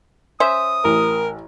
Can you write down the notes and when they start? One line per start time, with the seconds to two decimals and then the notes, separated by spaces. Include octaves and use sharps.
0.40 C#4 C5 E5 D#6
0.84 A1 A#4